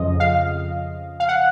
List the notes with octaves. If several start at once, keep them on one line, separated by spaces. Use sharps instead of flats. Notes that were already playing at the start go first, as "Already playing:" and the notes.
Already playing: F2 C#3 F3 D#5
F5
F5
F#5